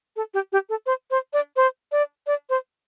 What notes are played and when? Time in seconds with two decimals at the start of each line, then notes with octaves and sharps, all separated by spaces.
0.16 A4
0.34 G4
0.52 G4
0.69 A4
0.86 C5
1.11 C5
1.33 D5
1.56 C5
1.92 D5
2.27 D5
2.50 C5